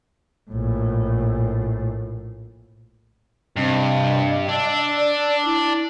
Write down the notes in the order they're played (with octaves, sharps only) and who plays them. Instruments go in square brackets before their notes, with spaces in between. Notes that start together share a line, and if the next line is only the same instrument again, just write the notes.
[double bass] A#1 A2
[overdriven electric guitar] G2 [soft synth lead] C3 [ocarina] D#5
[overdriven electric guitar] D4 [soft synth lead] E6
[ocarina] D5
E4